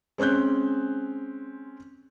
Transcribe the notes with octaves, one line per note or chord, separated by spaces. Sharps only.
G#3 C4 C#4 F#6 G6